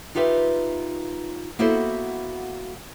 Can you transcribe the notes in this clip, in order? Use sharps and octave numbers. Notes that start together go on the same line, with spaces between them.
D#4 F4 G4 B4 E5
A#3 B3 E4 F#4 A4 C5